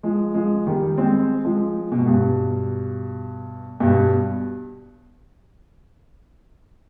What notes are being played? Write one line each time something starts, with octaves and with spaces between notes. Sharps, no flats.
F3 G#3
F3 G#3
D#3 G3
G#3 C4
F3 G#3
B2
G#2
G2 B2
G2 B2